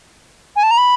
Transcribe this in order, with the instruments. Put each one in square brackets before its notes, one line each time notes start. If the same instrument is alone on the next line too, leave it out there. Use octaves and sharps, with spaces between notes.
[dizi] G#5
A5
A#5
B5